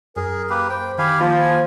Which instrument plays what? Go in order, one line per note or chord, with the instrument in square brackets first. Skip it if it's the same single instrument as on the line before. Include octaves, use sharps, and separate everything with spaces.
[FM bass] F#2 [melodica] G#4 [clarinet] A#4
[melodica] A#3 G4 B4
[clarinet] C5 [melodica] G5
[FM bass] D#3 [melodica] G4 F5 G#5 [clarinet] B5
[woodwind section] F3 [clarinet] A#3 [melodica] C5
[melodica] G#5